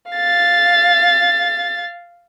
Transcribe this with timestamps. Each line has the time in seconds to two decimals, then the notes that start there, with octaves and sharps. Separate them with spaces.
0.11 F5 A6